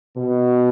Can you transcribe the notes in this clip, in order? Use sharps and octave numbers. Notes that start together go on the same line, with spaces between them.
B2